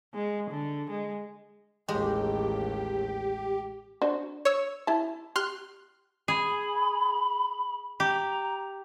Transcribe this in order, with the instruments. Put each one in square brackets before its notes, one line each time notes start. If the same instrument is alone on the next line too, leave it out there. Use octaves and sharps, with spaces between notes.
[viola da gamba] G#3
D3
G#3
[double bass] A1 D#2 [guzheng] G#3 [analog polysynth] G4
[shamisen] D4 F#4 C5
[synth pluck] C#5 E6
[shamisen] E4 A5
[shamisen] G4 [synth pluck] C6 F6 F#6
[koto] G#4 [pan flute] B5
[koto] G4 [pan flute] A#5